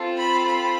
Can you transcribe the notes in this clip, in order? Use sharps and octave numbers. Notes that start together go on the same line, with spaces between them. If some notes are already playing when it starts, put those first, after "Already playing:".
Already playing: C4 F4 A4
B5
B5